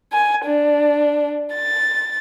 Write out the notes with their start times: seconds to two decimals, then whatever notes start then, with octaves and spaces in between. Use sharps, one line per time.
0.12 G#5
0.44 D4
1.53 A6